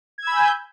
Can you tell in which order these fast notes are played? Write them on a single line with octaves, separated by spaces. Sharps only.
G#6 E6 B5 G#5 G6